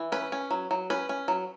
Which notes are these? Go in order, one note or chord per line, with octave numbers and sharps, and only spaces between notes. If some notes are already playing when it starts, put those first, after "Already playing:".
Already playing: E3
C#4 B4
C#4
F#3
F#3
C#4 B4
C#4
F#3